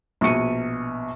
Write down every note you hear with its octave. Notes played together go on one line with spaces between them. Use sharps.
A#1 B2 C#6 C#7 D#7